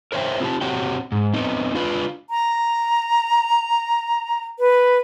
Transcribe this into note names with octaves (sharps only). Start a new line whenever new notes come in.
A#4 C5 C#5 E5 G5
C4 F4 G4 A5
C4 F#4 G4 C#5 F#5 G5
G#2
B3 C4 D#4
D4 F4 B4
A#5
B4